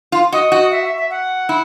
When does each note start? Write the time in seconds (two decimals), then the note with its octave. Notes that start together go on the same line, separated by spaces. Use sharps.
0.12 F4
0.32 F#4 D#5
0.52 F#4
0.71 E5
0.84 E5
0.97 E5
1.10 F#5
1.49 E4